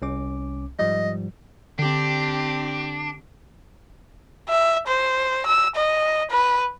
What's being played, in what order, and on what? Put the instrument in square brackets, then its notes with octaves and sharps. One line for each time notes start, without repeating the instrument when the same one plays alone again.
[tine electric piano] C2 C#4 D6
[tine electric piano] G#2 F3 G3 [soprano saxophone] D#5
[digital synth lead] D3 [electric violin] C4 G4 [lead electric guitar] D4
[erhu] E5
C5
E6
D#5
B4